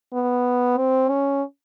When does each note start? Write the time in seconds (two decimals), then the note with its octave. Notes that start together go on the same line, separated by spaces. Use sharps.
0.13 B3
0.77 C4
1.09 C#4